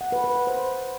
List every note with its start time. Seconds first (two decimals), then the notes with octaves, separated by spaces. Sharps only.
0.01 F#5
0.12 B4
0.24 B4
0.36 F#5
0.47 C5